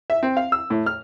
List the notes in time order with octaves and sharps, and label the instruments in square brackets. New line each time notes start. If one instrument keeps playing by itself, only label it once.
[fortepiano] E5
C4
F5
E6
A2
F6